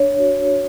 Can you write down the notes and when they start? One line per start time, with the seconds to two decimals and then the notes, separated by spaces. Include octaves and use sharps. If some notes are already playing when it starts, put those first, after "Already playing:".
Already playing: D4 C#5
0.19 F#4